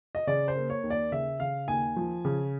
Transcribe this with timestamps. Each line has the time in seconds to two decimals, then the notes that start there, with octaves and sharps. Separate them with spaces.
0.15 D#5
0.27 C#3 D5
0.48 C5
0.56 A#3
0.70 C#5
0.83 D#2
0.90 D5
1.12 C#3 E5
1.40 C#3 F5
1.68 D#2 G#5
1.96 F3
2.25 C#3